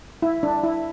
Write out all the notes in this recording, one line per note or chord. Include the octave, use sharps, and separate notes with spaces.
E4
D4
E4